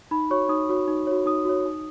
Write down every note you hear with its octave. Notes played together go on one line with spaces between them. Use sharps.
D#4 B5
F#4 C#5 C#6
D#4 D#6
F#4 C#5
D#4
F#4 C#5
D#4 D#6
F#4 C#5
D#4